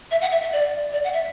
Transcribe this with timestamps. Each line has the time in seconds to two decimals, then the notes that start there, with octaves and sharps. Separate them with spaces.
0.11 E5
0.21 F#5
0.32 E5
0.42 E5
0.53 D5
0.93 D5
1.04 F#5
1.13 E5